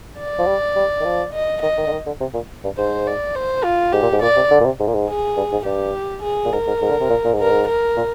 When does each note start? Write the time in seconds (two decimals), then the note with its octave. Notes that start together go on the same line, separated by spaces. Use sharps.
0.19 D5
0.39 F3
0.47 G3
0.76 G3
1.00 D#3
1.05 F3
1.33 D#5
1.62 D#3 D#5
1.77 D#3
1.87 D3
1.92 D#3
2.06 D3
2.20 C3
2.34 A#2
2.64 G2
2.78 G#2 C5
3.07 D5
3.35 C5
3.64 F4
3.93 G#2 G4
4.02 A#2
4.12 G#2
4.22 A#2 D5
4.36 C3
4.50 D3
4.60 A#2
4.65 C3
4.79 G#2
4.88 A#2
4.94 G#2
5.08 G#4
5.37 G2
5.52 G#2
5.65 G2 G4
6.23 G#4
6.45 A#2
6.52 G#2 A#4
6.67 G#2
6.81 G#2
6.90 D3
7.01 C3
7.09 A#2
7.25 A#2
7.33 G#2
7.39 G2 A#4
7.51 G#2
7.68 A#4
7.96 A#2